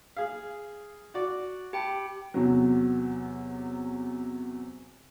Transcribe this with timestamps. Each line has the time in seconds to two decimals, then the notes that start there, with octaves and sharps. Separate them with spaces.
0.17 G#4 F5
1.14 F#4 D5
1.73 G4 G5 A5 B5
2.34 E2 C3 F#3